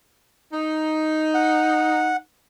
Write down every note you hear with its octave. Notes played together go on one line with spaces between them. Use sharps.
D#4
F#5